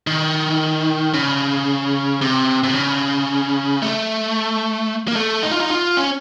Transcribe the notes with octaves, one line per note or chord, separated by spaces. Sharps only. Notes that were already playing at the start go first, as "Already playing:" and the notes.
D#3
C#3
C3
C3
C#3
A3
A#3
A3
D#4
F4
D#4
F4
C#4